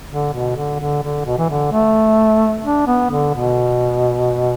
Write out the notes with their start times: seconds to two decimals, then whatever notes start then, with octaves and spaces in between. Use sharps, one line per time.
0.11 D3
0.33 B2
0.56 D3
0.80 D3
1.03 D3
1.25 B2
1.38 E3
1.49 D3
1.72 A3
2.64 D4
2.87 B3
3.11 D3
3.34 B2